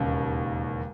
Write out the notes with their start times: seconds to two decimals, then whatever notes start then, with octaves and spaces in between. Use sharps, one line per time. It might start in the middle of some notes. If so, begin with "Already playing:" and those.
Already playing: E1 D#2 C#3